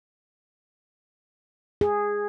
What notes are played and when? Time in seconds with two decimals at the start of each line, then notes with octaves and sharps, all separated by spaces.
1.81 G#4